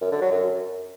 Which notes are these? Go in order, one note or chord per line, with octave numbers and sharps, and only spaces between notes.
F#2
D3
F#3
F#2